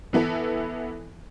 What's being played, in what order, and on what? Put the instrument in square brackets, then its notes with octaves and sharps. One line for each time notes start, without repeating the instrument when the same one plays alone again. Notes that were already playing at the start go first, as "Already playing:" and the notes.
[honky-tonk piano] E3 B3 E4 A4